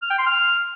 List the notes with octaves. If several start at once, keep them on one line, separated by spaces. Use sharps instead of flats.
F6
G5
C6
F6